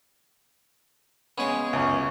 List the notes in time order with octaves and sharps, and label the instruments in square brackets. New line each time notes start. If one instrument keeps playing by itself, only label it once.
[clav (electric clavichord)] C#3 G#3 B3 [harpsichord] C#4 C#5 [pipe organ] G#4
[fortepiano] C#2 [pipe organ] F#2